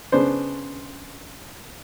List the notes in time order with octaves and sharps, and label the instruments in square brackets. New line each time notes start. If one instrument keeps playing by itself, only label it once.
[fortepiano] C#3 B3 D4 C5